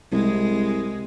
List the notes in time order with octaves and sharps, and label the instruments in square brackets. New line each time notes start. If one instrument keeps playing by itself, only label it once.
[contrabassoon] C2 [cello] G#3